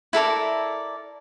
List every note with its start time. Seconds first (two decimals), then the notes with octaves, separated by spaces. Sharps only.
0.13 E4 A4 A#4 D5